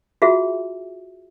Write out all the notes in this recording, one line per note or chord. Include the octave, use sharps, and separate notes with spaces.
F4 F#4 G#4 E5